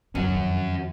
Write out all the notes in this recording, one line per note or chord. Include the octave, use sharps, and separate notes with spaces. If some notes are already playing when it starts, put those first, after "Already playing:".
F#2 C3 C#4 F#4
F2 D#3